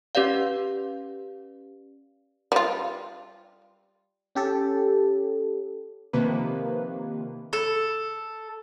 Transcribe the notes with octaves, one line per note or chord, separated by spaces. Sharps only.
C#4 G4 B4 D5 F5
G3 F4
C#4 G4 A4
C3 D#3 F3 A#3 B4
A4